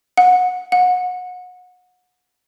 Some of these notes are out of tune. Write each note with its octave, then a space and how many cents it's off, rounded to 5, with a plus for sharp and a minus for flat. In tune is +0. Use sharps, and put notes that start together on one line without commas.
F#5 -25
F#5 -30